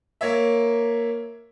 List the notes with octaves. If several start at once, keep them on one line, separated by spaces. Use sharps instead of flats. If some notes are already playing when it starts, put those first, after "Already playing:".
A#3 C#5 E5